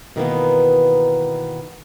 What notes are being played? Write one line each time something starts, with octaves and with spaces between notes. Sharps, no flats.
B2 D#3 E3 A#3 B3